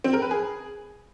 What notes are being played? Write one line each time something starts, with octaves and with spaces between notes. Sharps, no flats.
C4
A#4
B4
G#4